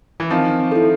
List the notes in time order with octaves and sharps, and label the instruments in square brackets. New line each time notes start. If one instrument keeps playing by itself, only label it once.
[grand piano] E3
[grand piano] D#3 F3 [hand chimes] C4
[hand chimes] E4 A4